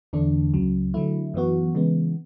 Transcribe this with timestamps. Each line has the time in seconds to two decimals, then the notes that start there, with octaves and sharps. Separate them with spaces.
0.13 E2 D3 A3 D4
0.54 C#2 C#3 F#3
0.94 D3 F#3 A3 E4
1.34 F#2 E3 B3 F#4
1.75 C#3 E3 G#3 B3